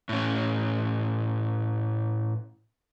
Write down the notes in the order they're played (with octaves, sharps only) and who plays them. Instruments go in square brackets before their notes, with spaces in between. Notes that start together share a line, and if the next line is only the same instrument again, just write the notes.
[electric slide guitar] A2 C#4